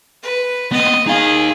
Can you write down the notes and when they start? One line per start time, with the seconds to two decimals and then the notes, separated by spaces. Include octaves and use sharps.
0.23 B4
0.72 B3 C4 D#5
1.07 D#4 G#4 F5